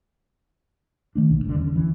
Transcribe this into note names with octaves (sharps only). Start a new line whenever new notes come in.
D#3 A3 D4
B1 A#2
G1 G2 B2 D3
E2 D3 C#4
E3